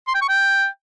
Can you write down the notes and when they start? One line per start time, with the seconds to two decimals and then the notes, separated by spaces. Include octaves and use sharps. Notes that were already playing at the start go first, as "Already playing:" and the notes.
0.08 C6
0.15 G5
0.22 C#6
0.29 G5